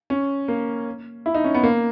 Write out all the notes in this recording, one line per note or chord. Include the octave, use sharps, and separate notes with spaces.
C#4
A#3
E4
D#4
C#4
B3
A#3